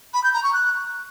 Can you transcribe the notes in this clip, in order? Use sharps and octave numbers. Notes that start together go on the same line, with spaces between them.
B5
G6
A#5
C#6
F#6